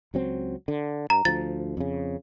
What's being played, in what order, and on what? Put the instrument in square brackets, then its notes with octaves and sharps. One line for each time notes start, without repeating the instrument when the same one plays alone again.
[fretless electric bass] C#2 F#3 C4
D3
[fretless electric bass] G2 [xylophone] A#5
[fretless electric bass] D2 F3 [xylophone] A6
[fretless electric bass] F2 C#3